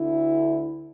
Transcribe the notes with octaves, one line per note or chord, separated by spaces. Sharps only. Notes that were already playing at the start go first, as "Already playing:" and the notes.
Already playing: D2 D3 E4